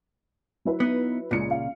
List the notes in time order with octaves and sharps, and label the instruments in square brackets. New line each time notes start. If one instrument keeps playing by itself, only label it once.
[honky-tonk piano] F#3 E4 B4
[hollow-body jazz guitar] B3 D#4
[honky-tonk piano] C#2 C#7 [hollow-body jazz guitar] A#2 C#3
[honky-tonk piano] F5